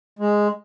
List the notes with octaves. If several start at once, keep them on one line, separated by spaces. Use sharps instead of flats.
G#3